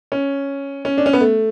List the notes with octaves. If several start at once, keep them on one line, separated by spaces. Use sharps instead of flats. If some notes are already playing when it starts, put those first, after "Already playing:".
C#4
C#4
D4
C#4
B3
A3